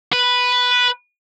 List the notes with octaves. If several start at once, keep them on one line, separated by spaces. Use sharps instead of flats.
B4